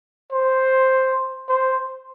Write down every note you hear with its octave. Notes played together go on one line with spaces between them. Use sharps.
C5
C5